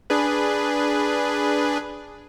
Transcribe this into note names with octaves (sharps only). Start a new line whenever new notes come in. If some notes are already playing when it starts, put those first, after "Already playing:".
D4 G#4 B4